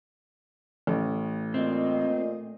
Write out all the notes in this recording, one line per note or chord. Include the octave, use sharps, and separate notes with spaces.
A1 A3
A#2 C4 D#5